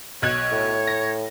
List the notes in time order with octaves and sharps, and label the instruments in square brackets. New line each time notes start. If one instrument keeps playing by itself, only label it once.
[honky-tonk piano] B1 F#6 G#6 [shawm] C#5
[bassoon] A2
[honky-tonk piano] A#6